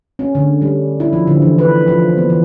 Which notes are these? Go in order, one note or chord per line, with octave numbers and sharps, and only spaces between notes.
C#4
D3
G3
E4
F3
D3
E3
B4
F3
B3
E3